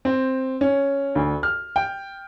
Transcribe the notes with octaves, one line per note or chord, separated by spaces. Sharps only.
C4
C#4
D2
F6
G5